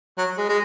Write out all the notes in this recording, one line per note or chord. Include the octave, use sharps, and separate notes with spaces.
F#3
G#3
G#3